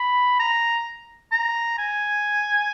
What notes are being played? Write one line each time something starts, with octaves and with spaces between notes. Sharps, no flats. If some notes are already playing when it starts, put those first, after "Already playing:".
Already playing: B5
A#5
A#5
G#5